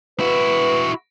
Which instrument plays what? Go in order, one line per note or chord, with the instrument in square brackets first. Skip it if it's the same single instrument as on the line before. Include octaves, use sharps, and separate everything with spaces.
[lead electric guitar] E4 F#4 [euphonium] B4